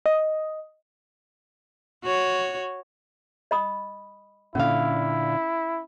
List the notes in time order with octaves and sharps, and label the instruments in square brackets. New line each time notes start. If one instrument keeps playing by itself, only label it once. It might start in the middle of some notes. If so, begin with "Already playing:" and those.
[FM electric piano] D#5
[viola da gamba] F#4 C#5
[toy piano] D#5 B5 D#6
[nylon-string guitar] A#2 D3 F5 [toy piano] C#4 [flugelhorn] E4